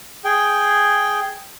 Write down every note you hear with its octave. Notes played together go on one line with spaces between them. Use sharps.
G#4 G5